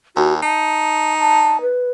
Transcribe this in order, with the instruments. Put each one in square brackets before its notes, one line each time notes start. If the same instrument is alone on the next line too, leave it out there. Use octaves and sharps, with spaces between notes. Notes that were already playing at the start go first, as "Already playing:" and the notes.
[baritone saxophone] D#2 [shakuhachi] F#4
[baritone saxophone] D#4 [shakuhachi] A5
[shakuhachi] A5
B4